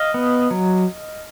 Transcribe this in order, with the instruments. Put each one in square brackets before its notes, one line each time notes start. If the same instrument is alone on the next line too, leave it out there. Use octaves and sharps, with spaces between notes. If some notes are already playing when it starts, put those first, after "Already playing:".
Already playing: [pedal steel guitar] D#5 F5
B3
F#3